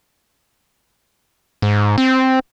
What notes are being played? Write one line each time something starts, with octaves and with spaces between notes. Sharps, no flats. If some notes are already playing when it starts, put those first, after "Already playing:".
G#2
C4